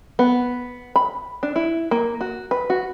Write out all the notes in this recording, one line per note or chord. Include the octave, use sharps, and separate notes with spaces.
B3
B5
D4
E4
A#3
F#4
B4
F#4